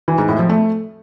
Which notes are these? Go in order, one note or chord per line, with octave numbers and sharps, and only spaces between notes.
E3
G#2
A2
F3
A3